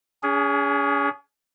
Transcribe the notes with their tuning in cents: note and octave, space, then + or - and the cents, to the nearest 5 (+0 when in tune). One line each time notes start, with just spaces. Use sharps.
C#4 +40 G#4 -10